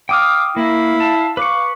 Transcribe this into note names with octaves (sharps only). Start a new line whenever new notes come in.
F5 G5 D6 D#6 F6
A#3 E4 F5
A5
B4 F5 C#6 D6